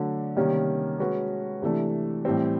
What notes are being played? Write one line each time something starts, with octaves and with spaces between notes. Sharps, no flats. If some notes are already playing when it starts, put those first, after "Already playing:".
Already playing: D3 F#3 A3 D4
C3 D#3 G3 A#3 C#4
G#3 C#4 F#4 B4
C3 E3 A3 D4
A2 E3 G3 C4